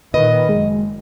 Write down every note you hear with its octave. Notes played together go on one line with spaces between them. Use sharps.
A#2 D#3 B4 D#5
F#1 G#3